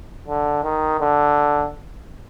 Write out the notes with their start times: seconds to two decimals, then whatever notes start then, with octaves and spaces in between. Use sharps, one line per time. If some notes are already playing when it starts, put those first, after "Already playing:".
0.28 D3
0.64 D#3
1.00 D3